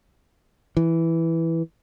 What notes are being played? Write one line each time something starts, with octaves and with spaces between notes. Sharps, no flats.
E3